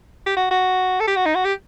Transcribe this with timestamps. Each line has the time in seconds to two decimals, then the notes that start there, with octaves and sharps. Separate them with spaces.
0.26 G4
0.37 F#4
0.51 F#4
1.00 A4
1.07 G4
1.16 F#4
1.26 D#4
1.35 F#4
1.45 G4